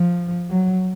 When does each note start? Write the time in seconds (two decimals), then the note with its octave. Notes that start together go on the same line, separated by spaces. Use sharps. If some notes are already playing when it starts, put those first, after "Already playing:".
Already playing: F3
0.50 F#3